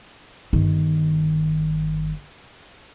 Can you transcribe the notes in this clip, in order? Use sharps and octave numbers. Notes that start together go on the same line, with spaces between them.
G1 D#3